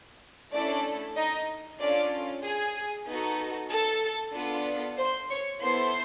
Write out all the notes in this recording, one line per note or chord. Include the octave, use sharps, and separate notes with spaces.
A3 C#4 D4 E4 A4 D5
D#4 D#5
C#4 D4 F4 A4 D5
G#4 G#5
B3 D#4 F#4 A4
A4 A5
B3 D4 F4 A4
C5 C6
C#5 C#6
B3 E4 A4 C5 C6